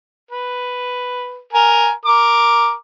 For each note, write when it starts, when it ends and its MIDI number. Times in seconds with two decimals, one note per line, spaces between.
0.31 1.41 71
1.53 1.91 70
1.53 1.91 80
2.05 2.73 70
2.05 2.73 86